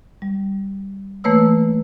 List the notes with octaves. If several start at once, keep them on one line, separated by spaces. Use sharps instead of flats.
G3
E3 A3 A#3 B4 C#5 E6